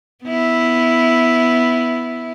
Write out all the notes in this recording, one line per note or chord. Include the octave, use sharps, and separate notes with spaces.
B3 E4